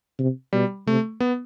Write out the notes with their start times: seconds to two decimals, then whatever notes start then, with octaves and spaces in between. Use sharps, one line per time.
0.19 C3
0.53 B2 G3
0.87 C3 A3
1.20 B3